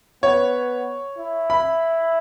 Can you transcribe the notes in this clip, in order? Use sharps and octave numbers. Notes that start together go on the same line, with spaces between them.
B3 C#5
E4
B5